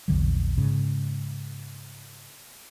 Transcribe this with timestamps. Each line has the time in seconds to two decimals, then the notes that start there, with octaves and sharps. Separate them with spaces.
0.08 A#1 E2 D3 F#3
0.58 G#2 C#3